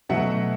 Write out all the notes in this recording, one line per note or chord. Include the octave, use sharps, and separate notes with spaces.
B2 F#3 A3 E5 F#5